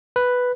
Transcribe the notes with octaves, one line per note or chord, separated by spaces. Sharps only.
B4